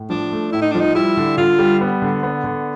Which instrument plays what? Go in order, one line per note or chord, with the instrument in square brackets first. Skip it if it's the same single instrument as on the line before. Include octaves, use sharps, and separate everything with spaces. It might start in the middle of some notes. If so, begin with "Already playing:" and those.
Already playing: [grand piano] A2
[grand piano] F3 [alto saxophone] D4
[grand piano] A3
[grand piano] A2 [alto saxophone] E4
[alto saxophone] D#4
[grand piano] F3 [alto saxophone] D4
[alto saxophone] D#4
[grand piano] G3 [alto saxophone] E4
[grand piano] D3
[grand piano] D3 [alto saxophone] F4
[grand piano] G3
B3
D3
B3
D3